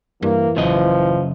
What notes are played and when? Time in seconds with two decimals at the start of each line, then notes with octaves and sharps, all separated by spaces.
0.22 G2 E3 A#3
0.56 A1 F#2 C#3 F3 D#5